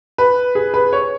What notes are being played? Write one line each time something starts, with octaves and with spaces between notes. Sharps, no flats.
B4
G#4
B4
C#5